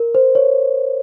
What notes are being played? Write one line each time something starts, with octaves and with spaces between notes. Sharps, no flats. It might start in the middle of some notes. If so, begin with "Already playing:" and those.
Already playing: A#4
C5
C#5